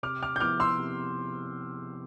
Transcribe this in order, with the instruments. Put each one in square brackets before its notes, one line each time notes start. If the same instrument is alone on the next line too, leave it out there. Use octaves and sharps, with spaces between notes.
[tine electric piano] C3 [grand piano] D6 F6
[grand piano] D6 F6
G6
[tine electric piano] F3 B3 E4 [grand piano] D6 F6
[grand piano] C6 E6
[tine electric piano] C3